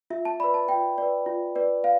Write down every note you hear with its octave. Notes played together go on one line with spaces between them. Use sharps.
F4 E5
A5
B4 D5 B5
A5
F4 G5
B4 D5
F4
B4 D5
F5